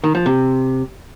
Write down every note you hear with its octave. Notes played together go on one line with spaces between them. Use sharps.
D#3
F3
C3